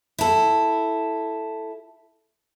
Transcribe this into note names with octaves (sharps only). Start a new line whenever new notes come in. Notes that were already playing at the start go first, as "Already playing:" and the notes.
E4 A4